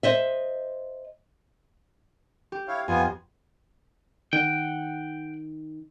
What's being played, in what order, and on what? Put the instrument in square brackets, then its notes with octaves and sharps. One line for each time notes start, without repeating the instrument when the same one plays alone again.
[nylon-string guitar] C5 D#5 E5
[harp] G4
[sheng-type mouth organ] E4 C#5 F5
[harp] F2 [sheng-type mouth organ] B3 F4 G#5
[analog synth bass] D#3 [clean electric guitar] F#5 G5